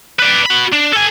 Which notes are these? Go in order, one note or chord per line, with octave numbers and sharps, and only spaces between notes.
B4 D5
F#4 B5
D4
A4 G#5